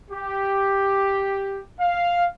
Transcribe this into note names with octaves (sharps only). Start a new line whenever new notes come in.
G4
F5